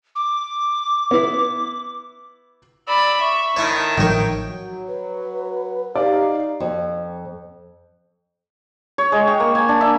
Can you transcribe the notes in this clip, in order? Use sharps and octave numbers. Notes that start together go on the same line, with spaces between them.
D6
B3 E4
D5 B5 E6
E5 C#6
D#3 E4 A4 C#5
A1 D#3 F3 F#3 C#5 G5
F#3
B4
D#4 G4 D5 F5
F2
C#5
G#3
G5
A#3
G#5
D4
E5